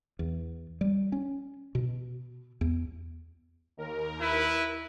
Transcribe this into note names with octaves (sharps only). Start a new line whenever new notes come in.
E2
G3
C#4
B2
E2
D#2 A#4
E4 B4